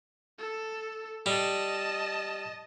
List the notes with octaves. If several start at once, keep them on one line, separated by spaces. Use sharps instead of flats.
A4
G3 D#5 A5